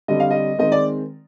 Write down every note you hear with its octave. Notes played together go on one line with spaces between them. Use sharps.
D3 G3 C4 D#5
F5
D#5
D#3 G#3 C4 D#5
D5